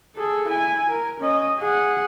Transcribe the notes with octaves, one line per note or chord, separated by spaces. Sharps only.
G#4 A4
E4 G#5
A#4
C#4 D#5
G#4 F#5